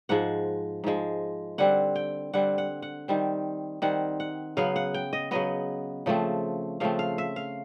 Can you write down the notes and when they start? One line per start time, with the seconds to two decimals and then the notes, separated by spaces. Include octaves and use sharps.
0.09 G#2 F3 G#3 F#5
0.84 G#2 F3 G#3
1.58 D3 G3 C4 F#5
1.96 G5
2.33 D3 G3 C4 F#5
2.58 F#5
2.82 F#5
3.08 D#3 G3 C4
3.82 D#3 G3 C4 F#5
4.20 F#5
4.57 C#3 F#3 B3 F5
4.76 F#5
4.94 G5
5.13 D#5
5.31 C#3 F#3 B3 D#5
6.06 C#3 F3 A3 C4
6.80 C#3 F3 A3 C4 F5
6.99 F5
7.18 E5
7.36 F5